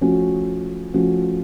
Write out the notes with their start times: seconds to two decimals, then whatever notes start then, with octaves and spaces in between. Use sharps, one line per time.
0.01 F3 A3 C#4 F#4
0.94 F3 A3 C#4 F#4